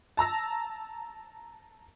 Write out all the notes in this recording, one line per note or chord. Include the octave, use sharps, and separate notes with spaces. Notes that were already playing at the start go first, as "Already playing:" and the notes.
A5 A#5 E6 A#6